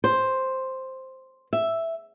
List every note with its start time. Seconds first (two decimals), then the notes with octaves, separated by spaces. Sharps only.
0.04 C5
1.53 E5